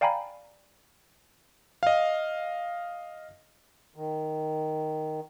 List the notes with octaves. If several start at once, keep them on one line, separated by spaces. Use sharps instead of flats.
D5 F5 G5 G#5 A#5 B5
D#5 F5
D#3